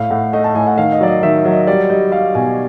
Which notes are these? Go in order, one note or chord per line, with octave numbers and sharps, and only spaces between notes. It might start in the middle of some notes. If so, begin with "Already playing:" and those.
Already playing: A2 F5
A2 F#5
A3 D#5
A5
A2 G#5
F#5
D#3 F5
D#5
F#3 D5
D#5
D#3 E5
F#3
D#5
G3 D5
G3 D#5
G3 F5
B2 G#5